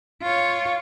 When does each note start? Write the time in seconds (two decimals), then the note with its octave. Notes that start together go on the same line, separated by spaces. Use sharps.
0.22 F4 C#5